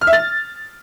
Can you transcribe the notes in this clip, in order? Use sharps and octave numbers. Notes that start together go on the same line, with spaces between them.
F6
E5
A6